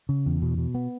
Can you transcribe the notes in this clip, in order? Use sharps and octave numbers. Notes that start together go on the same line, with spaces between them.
C#3
E2
B2
B2
B3